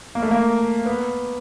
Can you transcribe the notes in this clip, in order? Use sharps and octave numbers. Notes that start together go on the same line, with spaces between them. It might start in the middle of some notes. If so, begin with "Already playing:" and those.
A#3
A3
A#3
B3